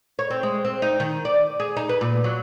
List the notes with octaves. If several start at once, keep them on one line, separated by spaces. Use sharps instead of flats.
C#5
C4
G#3
C4
D#4
D#3
D5
G#4
D#4
B4
A#2
F#3